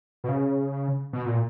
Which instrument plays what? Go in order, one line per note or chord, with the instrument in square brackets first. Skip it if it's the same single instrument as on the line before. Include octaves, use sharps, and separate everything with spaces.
[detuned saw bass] B2
C#3
B2
A#2